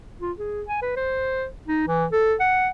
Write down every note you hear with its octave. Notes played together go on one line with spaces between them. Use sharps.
F4
G#4
G#5
B4
C5
D#4
E3
A4
F#5